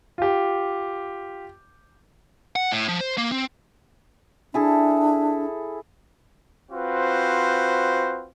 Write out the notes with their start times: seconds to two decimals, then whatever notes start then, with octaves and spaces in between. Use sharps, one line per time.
0.18 F4 G4
2.56 F#5
2.72 A2
2.88 F3
3.01 C5
3.18 A#3
3.32 C4
4.54 D4 E4 G#4 A4
6.71 C4 F4 F#4 B4 C5